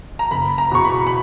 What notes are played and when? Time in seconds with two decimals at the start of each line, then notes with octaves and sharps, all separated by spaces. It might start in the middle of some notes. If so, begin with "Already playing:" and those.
0.19 A#5
0.31 F#1 B5
0.58 A#5
0.71 E2 B2 C#6
0.85 B5
1.07 B5